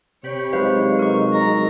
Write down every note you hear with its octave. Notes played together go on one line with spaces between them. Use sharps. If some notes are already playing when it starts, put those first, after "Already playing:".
C3 C#5 G5 B5
F#3 G#3 D#4 B4 C5 F5
A#4 C#6
C4 A#5